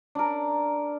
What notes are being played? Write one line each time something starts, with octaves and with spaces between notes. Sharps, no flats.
D4 A#4